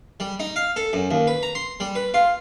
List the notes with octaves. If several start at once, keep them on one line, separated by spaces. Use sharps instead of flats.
G3
D#4
F5
A4
F#2
D#2
B4
A#5
C6
G3
B4
F4